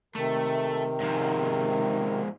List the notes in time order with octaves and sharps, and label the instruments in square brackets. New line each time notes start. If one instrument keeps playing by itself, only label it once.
[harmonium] C3 D#3 [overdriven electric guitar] A3
[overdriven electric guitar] G#2 F3